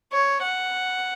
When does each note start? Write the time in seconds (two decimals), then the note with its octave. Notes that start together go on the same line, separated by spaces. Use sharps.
0.13 C#5
0.42 F#5